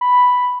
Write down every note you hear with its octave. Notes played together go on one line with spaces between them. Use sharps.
B5